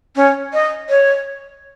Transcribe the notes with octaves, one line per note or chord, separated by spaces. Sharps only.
C#4
D#5
C#5